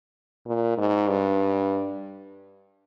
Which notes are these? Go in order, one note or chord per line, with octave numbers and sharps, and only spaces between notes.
A#2
G#2
G2